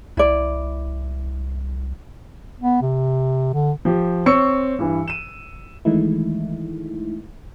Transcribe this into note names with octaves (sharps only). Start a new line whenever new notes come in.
C2 E4 D5
B3
C3
D3
F3 G4
C4 C#5 C#6 E6 C#7
G2 E3
D#7 E7
D#3 E3 G#3 A3 D#4 E4